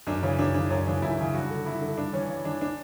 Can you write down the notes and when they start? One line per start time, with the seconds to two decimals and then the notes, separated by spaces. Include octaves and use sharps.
0.07 F#2 D4
0.23 C#3 E3 C#4
0.39 F#2 D4
0.55 C#3 E3 D4
0.70 F#2 C#4
0.87 C#3 E3 D4
1.02 F#2 E4
1.19 C#3 E3
1.34 G2 F#4
1.50 D3
1.66 G2 E4
1.81 D3
1.98 G2 D4
2.13 E3 C#4
2.30 G2
2.45 E3 D4
2.61 D4